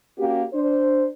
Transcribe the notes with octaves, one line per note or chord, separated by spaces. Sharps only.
A#3 C#4 F#4 G4
D4 C5